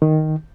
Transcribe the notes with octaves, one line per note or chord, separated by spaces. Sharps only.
D#3